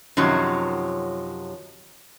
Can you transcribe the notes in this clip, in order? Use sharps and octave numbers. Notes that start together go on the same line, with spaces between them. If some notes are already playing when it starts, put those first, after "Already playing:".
F#2 C3 D#3 F3 F#3